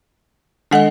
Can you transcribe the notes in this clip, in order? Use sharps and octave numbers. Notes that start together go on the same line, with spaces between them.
D#3 G#3 D4 A4 D#5 F#5